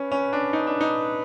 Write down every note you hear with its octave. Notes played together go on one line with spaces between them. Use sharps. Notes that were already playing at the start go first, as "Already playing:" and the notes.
Already playing: C#4 B4
C#4
D4
D#4
D4
D#4